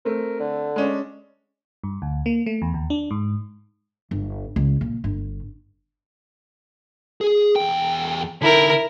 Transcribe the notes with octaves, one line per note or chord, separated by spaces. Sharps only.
A3 C4 A#4
D3
G#3 C#4 D4
G2
D2
A#3
A3
E2
D#2
D4
G#2
G1
C#2
A#2
G1
G#4
E2 G5
D3 D#4 E4 A#4